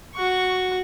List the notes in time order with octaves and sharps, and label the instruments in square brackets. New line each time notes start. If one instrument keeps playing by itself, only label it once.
[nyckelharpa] F#4 C#6